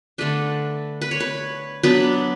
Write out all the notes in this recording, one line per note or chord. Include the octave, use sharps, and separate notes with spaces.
D3 A3 D4 B4
B4
C#5
B4
F#3 B3 D4 B4